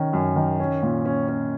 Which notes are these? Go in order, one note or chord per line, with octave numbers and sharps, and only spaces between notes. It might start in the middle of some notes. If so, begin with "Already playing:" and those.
Already playing: D#3 C#4
F#2
D#3
C#4
A#2
C#4
C#4